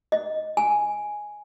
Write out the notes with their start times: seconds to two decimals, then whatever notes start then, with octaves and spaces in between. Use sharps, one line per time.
0.12 D#5
0.57 G#5